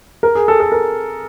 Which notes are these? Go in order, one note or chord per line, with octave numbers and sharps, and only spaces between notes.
A#4
G#4
A4
A4
A#4